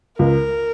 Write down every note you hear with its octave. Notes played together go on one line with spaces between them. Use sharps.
C#2 A#4